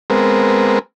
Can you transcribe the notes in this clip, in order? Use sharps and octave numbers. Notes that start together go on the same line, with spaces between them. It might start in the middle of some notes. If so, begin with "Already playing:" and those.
G#3 B3 C4 A#4